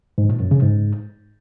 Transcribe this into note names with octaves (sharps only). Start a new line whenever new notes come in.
G#2
A#2
F#2
C#3
G#2